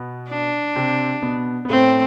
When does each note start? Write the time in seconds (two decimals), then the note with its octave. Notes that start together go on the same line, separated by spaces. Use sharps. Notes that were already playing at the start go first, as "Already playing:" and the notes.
Already playing: B2 B3
0.29 D4
0.75 C3 C4
1.22 B2 B3
1.65 B3
1.70 A2 A3 C4